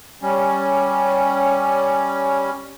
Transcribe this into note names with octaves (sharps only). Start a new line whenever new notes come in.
G3 C#4